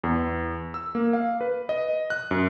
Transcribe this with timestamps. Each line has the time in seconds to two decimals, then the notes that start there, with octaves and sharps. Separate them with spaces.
0.04 E2
0.74 E6
0.95 A#3
1.13 F5
1.41 B4
1.69 D#5
2.10 F#6
2.31 F#2